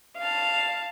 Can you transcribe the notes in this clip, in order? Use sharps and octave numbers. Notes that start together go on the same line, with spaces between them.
F5 A5